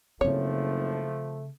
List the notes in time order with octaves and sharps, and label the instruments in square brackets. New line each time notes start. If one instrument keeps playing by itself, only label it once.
[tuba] F#1 [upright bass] C#3 C4 [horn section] F3 A3 [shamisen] C#5